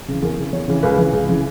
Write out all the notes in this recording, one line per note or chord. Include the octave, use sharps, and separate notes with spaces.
C#3 E3
E2 A#4
C#3 E3
E2 C#5
C#3 E3
C#2 B4
C#3 E3
C#2
C#3 E3